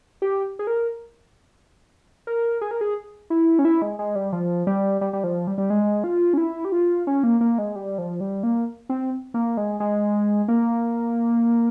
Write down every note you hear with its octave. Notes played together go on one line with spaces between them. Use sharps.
G4
G#4
A#4
A#4
G#4
A#4
G#4
E4
C#4
E4
G#3
G#3
G3
F3
G3
G3
G3
F3
G3
G3
G#3
F4
C#4
E4
G4
F4
C#4
A#3
A#3
G#3
G3
F3
G3
A#3
C4
A#3
G#3
G#3
A#3